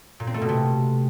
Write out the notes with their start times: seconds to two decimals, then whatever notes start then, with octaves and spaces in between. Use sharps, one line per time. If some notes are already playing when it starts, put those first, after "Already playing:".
0.20 A#2
0.27 C4
0.34 A3
0.41 B2
0.49 C3